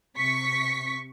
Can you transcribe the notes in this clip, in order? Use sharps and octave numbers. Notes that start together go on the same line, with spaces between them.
C3 C#6 B6